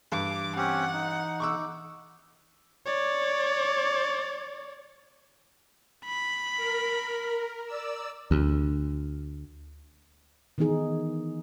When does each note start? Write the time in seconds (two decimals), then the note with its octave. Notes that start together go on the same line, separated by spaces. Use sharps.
0.12 G2 E3 D6
0.57 C4 C#4 G4 F#5
0.93 D#4
1.40 C#6 D6 E6
2.86 C#5 D5
6.05 B5
6.55 A#4
7.66 D5 E6
8.31 D2
10.58 D#3 E3 B3 D#4 G#4